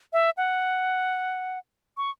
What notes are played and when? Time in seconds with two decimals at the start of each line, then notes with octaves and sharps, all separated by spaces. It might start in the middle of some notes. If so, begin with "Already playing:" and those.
0.13 E5
0.37 F#5
1.97 C#6